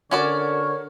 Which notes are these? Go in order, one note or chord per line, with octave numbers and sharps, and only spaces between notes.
D3 C#4 F#4 A#4 C#5 D5